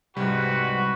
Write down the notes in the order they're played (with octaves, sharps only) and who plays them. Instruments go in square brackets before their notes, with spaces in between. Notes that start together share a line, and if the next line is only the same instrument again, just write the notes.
[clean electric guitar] C2 [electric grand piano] G#2 G3 [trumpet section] F#4 B4